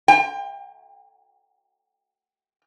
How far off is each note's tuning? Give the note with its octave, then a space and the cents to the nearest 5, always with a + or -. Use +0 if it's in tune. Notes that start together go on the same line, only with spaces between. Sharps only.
G5 +30